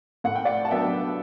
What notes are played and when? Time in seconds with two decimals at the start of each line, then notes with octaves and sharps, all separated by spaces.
0.24 A2 F#5
0.35 G5
0.45 D5 F#5
0.65 A5
0.70 F#3 B3 D4 E5 G5